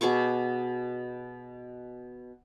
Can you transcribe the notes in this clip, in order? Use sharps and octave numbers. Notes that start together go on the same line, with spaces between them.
B2 G#4 C#6 D6